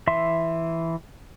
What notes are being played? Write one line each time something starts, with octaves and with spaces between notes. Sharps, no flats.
E3 E5 C6